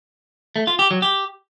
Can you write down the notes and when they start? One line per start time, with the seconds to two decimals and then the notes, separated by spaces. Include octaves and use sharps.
0.56 A3
0.67 F4
0.79 G4
0.91 F#3
1.02 G4